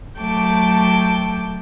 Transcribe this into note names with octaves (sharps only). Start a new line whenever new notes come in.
F#3 A3 G5 A5 D6